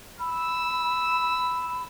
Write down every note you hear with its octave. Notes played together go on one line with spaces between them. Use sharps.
B5 E6